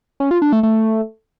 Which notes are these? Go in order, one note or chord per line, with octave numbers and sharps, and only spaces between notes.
C#4
F4
D4
A3
A3